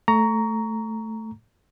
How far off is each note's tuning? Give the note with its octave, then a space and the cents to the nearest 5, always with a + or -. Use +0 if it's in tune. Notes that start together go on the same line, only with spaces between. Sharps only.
A3 +0 A#5 +0 C#6 +25